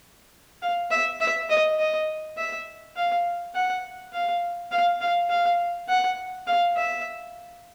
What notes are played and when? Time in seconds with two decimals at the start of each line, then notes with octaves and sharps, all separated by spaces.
0.62 F5
0.91 E5
1.21 E5
1.50 D#5
1.79 D#5
2.37 E5
2.96 F5
3.55 F#5
4.13 F5
4.72 F5
5.01 F5
5.30 F5
5.88 F#5
6.47 F5
6.76 E5